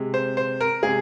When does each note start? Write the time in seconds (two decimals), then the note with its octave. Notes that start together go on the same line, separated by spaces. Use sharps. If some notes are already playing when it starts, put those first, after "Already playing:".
Already playing: C3 G#3
0.14 C5
0.37 C5
0.61 A#4
0.83 C3 G#3 G#4